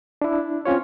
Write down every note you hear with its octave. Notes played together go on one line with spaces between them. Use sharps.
D4 E4
C4 C#4 F4 C#5